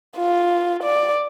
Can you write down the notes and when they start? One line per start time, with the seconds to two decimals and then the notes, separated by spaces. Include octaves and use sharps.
0.17 F4
0.83 D5